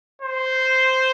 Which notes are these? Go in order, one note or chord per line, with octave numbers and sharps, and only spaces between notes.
C5